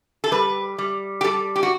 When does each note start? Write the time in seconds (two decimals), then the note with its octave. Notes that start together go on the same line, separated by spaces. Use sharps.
0.24 A4
0.31 G3 B4
0.78 G3
1.21 G4
1.24 G3 A4
1.56 G4
1.63 F#4